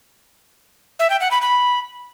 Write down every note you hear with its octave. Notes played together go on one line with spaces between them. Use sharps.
E5
G5
F#5
B5
B5